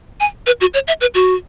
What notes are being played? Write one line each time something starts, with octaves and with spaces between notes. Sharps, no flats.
G#5
B4
F#4
C#5
E5
B4
F#4